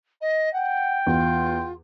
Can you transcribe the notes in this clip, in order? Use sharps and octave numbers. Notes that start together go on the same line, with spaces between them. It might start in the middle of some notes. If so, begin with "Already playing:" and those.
D#5
F#5 G5
E2 F4